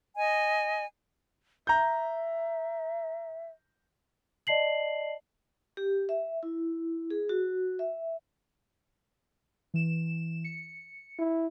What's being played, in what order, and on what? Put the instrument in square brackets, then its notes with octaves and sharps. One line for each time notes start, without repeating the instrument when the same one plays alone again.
[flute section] D#5 G#5
[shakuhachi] E5 [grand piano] A#5 G6
[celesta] D5 D#5 A5 C7 F#7
[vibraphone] G4
E5
E4
G#4
F#4
E5
[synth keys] E3 E7
C#7
[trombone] E4